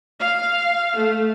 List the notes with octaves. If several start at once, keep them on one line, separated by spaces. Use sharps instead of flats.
F5
A3